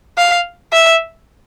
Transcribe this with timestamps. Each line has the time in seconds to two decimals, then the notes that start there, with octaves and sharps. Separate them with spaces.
0.17 F5
0.73 E5